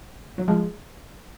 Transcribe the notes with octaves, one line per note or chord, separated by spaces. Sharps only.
F#3
F3 G#3